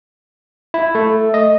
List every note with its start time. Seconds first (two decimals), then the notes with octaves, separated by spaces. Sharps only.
0.74 E4
0.95 A3
1.34 D#5